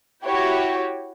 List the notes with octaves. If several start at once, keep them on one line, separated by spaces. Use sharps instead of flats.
E4 F#4 G4 C#5 G5